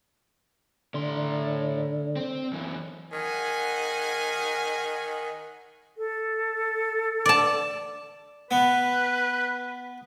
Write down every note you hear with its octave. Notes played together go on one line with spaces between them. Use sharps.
A2 D3 C6
C4
F#2 E3
D#3 F#5 G#5
A4
D5 A5
B3 B4